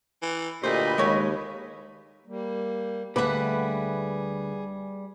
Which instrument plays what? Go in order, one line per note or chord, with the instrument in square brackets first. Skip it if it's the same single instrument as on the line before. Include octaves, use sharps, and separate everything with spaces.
[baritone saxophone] E3
[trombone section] D2 A#2 G4 [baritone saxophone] A3 [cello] B4 D#5 [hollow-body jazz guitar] C5
[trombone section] D#2 [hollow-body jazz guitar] G#3 C#5
[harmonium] G3 A#3
[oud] D2 E5 [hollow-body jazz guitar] G3 A#3 B5 [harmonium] G#4 [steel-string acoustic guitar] B4 F#5